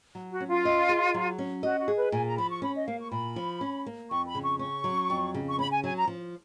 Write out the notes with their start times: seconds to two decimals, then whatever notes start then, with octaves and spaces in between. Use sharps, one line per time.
0.15 F#3
0.31 F#4
0.40 C#4
0.48 F4
0.65 D#5
0.89 G#4
1.14 F#3
1.39 C#4
1.63 F#4 D#5
1.79 F#4
1.88 G#4
1.96 B4
2.12 A#2 G#5
2.26 A#5
2.37 F3 B5
2.50 C#6
2.62 C#4 B5
2.75 D#5
2.87 A#3 F5
2.99 C#6
3.12 A#2 B5
3.36 F3
3.61 C#4
3.86 A#3
4.10 F2 C#6
4.27 B5
4.35 C#3
4.43 C#6
4.59 C#4 C#6
4.84 F#3
5.10 F2
5.34 C#3
5.49 C#6
5.59 C#4 B5
5.71 G#5
5.84 F#3 G#5
5.96 A#5
6.07 F3